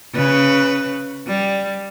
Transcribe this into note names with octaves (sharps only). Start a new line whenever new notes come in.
C#3 B4
G3